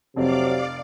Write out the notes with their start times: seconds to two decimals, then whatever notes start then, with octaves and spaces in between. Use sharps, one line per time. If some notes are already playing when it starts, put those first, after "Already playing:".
0.16 F1 F2 C3 F#3 D5 F5 D6